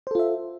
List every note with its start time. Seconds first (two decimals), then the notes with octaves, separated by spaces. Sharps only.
0.07 C5
0.11 A4
0.15 F4
0.19 E5